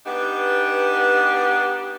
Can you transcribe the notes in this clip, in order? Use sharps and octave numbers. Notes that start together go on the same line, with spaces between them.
B3 D4 D#4 G4 B4